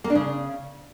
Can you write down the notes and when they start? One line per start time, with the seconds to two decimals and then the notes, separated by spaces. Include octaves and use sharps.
0.04 A#3
0.10 D4
0.15 C#3